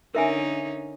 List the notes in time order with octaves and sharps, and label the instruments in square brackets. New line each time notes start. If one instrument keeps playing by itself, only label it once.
[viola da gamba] D3 C#4 D#4 [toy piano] A#4 E5 G#5